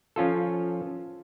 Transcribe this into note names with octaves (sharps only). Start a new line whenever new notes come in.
F3 C#4 F4 A4